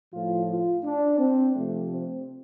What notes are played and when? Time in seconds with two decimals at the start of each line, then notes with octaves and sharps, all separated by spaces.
0.13 A2 F3 F4
0.48 F4
0.83 D4
1.19 C4
1.54 C3 F3 A3
1.89 C4